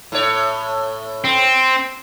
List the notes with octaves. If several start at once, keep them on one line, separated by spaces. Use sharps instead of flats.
A2 C#5
C4